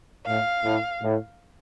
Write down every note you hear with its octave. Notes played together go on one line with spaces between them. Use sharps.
A2 F5
A2
A2